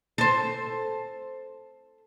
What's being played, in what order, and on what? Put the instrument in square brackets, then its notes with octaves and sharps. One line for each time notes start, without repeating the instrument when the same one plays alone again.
[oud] A4 C5